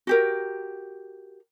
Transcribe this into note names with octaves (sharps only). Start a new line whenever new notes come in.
F#4 G4 A#4